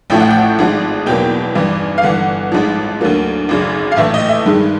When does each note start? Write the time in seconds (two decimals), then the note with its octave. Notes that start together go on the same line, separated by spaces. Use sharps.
0.10 A1 A2 F3 A3 G5
0.20 F#5
0.31 G5
0.59 G#1 G#2 F3 G#3
1.06 E2 B2 F#3 A#3 G5
1.55 G#1 G2 E3
1.98 F5
2.03 G1 G2 E3 F#5
2.52 A1 G#2 F3
3.01 D2 D3 F#3 A#3
3.49 G#1 F#2 C#3
3.92 F5
3.97 A#1 A2 E3 A3 E5
4.14 D#5
4.29 E5
4.46 G2 D#3 G#3